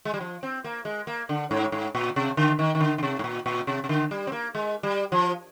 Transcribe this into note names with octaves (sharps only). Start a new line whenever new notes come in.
G#3
G3
F3
C4
A#3
G#3
A#3
D3
G#2
G#2
A#2
C3
D3
D#3
D#3
D3
D3
C3
G#2
A#2
A#2
C3
C3
D3
G3
C4
A#3
G#3
G3
F3